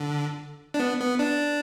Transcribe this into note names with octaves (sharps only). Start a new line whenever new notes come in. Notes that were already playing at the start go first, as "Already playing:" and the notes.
Already playing: D3
D4
B3
B3
D4